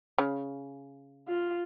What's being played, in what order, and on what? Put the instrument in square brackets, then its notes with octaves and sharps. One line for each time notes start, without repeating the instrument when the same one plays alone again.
[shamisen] C#3
[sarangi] F4